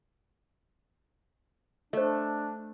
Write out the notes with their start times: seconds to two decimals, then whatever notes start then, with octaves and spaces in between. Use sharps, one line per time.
1.93 A3 D4 C5 D#5